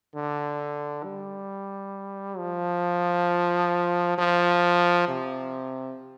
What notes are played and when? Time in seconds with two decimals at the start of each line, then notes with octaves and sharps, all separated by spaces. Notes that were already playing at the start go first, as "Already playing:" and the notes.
0.15 D3
1.03 G3
2.38 F3
4.18 F3
5.08 C3